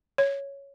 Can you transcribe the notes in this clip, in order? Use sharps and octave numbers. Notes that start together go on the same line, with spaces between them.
C#5